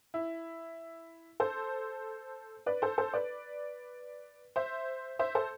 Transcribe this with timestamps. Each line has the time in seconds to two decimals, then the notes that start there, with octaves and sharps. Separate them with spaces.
0.14 E4
1.40 A4 C5
2.66 B4 D5
2.82 A4 C5
2.98 A4 C5
3.14 B4 D5
4.56 C5 E5
5.19 C5 E5
5.35 A4 C5